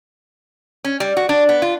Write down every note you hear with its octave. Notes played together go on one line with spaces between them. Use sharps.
C#4
G3
F#4
D4
B3
F4